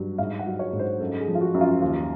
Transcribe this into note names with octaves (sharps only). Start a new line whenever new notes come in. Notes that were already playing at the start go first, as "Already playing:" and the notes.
Already playing: G2 F#3
G#2 F5
F#5
F#3
C#5
G#2
C5
F#2 A4
G#4
F3
F4
F#4
F#2
F4
D#2 F4